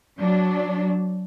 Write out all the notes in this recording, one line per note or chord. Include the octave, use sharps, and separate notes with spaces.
F#3 D4